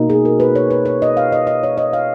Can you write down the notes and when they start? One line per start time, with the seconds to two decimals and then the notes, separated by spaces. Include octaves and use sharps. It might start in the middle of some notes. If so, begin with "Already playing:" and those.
Already playing: B2 A#3 D#4
0.10 G#4
0.25 A#4
0.40 B4
0.55 C#5
0.71 B4
0.86 C#5
1.02 D#5
1.17 F5
1.32 D#5
1.47 D#5
1.63 C#5
1.78 D#5
1.93 F5